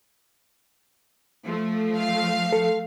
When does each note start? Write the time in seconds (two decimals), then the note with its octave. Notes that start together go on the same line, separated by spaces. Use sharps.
1.44 F3 A3
1.99 F5
2.52 A4